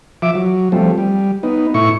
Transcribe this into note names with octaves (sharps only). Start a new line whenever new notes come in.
F3 E5 D6
F#3
F3 G3 A3 C4
G3
B3 D#4
A2 E4 C#6